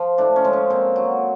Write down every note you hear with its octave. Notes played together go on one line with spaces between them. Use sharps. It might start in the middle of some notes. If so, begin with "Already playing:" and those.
Already playing: F3
A2 D4
C#4
F3 G#3
C#4
A#2 C4
F#3